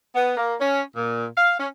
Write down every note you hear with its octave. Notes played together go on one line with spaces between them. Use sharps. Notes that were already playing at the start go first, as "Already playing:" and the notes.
B3
A#3
C#4
A#2
F5
C#4